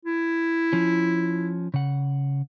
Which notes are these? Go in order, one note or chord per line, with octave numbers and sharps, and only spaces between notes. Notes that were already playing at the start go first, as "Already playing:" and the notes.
E4
F3 C#4
C#3 F#5